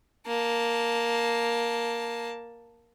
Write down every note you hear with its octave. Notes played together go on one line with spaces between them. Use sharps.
A#3 A5